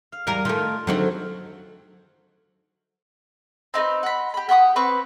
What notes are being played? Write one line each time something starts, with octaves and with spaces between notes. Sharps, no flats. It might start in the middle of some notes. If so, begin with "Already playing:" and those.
F5
E2 G3 A#4 F5 G#5 A#5
D#3 A3 F4 G5 G#5
D3 D#3 F#3 A3 C4 F#4
C4 D#4 A#4 B4
F#5 B5
G4 B5
G4 F#5 C#6 D#6
C4 B4 C#6